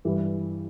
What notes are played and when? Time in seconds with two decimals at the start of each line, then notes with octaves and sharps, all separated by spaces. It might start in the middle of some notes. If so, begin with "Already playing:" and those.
0.05 G2 E3 G3